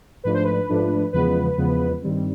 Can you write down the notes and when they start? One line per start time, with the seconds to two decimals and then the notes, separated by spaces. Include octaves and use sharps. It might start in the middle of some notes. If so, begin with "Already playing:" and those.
0.24 G#2 F3 A3 D4 B4
0.34 C5
0.44 B4
0.69 G#2 F3 A3 D4
1.13 E2 C#3 F3 G#3 B3 B4
1.57 E2 C#3 F3 G#3 B3
2.02 G2 D#3 G3 C4